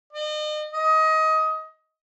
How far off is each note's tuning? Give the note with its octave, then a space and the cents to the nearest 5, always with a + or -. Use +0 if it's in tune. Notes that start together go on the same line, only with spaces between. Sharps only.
D#5 -40
D#5 +20